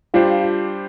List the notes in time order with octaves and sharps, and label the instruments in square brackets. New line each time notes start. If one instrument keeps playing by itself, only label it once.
[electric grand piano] G3 D4 G4 C5 [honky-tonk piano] F4